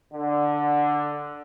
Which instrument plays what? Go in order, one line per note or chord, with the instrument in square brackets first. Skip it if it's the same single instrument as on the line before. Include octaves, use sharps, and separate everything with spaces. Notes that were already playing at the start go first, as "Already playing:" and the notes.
[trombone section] D3